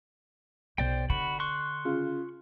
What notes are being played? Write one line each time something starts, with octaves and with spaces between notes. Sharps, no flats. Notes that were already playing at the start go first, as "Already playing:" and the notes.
B1 C5 D5 G5
D3 F#4 B5
C6 C#6 F#6
C#3 F4